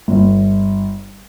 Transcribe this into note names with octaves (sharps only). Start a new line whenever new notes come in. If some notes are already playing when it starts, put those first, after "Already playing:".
G1